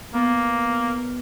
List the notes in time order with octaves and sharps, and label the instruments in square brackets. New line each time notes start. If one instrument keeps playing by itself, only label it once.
[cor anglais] A#3 [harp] B3